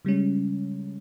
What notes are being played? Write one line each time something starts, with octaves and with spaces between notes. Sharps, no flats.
C#3 G3 G#3 C#4